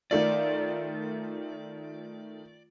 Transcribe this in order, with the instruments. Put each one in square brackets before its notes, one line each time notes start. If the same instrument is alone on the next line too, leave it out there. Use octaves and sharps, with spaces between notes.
[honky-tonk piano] D#3 A3 F4 [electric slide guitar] D5